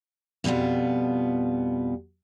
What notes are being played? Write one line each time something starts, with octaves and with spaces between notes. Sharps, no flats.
F2 B2 G3 B3 F4